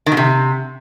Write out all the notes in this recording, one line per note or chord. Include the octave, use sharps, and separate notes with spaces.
D#3
B2
C3